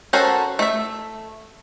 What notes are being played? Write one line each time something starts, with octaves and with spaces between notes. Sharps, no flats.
C#4 F#4 A4 A#4 C5
A3 E5